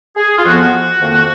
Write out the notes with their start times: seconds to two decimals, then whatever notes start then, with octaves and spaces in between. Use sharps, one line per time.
0.16 G#4
0.38 F4
0.44 F2 F3 B3 F#4
1.01 F2 D#3 A#3